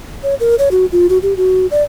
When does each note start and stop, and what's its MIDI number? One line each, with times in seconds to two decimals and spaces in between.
0.23 0.35 73
0.40 0.55 70
0.59 0.69 73
0.71 0.86 66
0.92 1.07 65
1.09 1.18 66
1.22 1.34 67
1.37 1.67 66
1.71 1.83 74